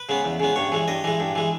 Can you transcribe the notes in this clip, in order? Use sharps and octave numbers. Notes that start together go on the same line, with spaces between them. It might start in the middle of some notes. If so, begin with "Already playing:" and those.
Already playing: B4
C#3 G#3 B3
E2
C#3 G#3 B3
G2 C#5
E3 G#3
G2 D#5
E3 G#3
G2
E3 G#3